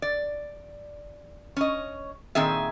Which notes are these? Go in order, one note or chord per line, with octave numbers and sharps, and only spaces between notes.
D5
C#4 D#5
A#2 D#3 C4 G#4 E5